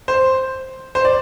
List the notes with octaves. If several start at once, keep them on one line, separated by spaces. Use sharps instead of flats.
C5
C5
D5